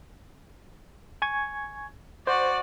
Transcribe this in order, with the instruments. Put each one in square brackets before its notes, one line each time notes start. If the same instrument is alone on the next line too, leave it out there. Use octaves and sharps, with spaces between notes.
[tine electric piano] G#5 C#6 G#6
[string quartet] F#4 D5 [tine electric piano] C5